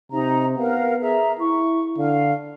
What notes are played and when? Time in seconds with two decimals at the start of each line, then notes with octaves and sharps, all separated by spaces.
0.12 C3 D#4 A#5
0.58 B3 A#4 F5 F#5
1.01 G#4 E5 A#5
1.40 E4 C#6
1.98 D3 F5